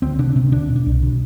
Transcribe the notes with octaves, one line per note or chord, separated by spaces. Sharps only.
D2 C4
C3 D4
C3 C4
D2 D4
B2
D4
C2
B2